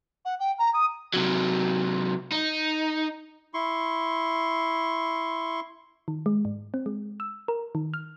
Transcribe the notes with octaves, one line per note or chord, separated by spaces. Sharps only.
F#5
G5
A#5
D#6
C3 F#3
D#4
E4 C6 C#6
D#3
G#3
G#2
C4
G#3
E6
A#4
D#3
F6